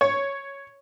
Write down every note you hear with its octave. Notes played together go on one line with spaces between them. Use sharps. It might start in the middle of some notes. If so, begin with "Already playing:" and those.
C#5